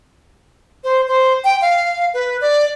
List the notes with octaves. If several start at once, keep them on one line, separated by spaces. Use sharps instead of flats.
C5
C5
G5
F5
B4
D5